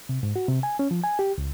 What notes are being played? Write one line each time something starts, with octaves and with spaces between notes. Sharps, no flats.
C3
G#2
F#4
C3
G#5
C#4
F3
G#5
G4
C#2